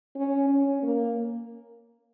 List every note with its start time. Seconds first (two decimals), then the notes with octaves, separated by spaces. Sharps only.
0.16 C#4
0.50 C#4
0.83 A#3